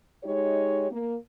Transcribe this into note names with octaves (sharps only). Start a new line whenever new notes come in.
G#3 D#4 G4 C#5
A#3